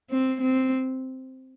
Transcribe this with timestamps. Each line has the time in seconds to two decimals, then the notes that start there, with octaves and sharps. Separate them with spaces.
0.11 C4
0.41 C4